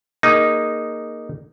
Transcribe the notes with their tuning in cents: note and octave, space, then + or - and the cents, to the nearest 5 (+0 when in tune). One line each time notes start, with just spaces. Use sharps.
A#3 +0 D#4 -5 G#4 +0